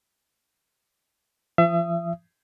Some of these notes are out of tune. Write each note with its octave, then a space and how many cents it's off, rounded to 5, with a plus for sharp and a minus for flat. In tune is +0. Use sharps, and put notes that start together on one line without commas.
F3 -35 E5 +35 D#6 +0